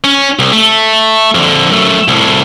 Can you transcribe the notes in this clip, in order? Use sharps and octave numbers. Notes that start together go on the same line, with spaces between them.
C#4
C2
A3
F2 D3
F#2 A3
C2 A2